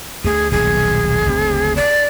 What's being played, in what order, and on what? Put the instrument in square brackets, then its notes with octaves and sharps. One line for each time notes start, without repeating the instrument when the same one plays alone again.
[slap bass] D2 A3 [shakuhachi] G#4
[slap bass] D#1 B1 A2 [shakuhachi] G#4
[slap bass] F#1 D2 C4
[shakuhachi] D5